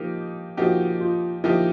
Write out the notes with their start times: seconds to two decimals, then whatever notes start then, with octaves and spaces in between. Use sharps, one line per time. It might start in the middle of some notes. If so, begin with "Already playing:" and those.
Already playing: F3 A#3 D#4 G4
0.57 F3 A#3 D#4 F#4 G4
1.00 F4
1.44 F3 A#3 D#4 E4 G4